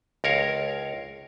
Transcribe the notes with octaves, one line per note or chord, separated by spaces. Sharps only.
C#2 A#4 C#5 F5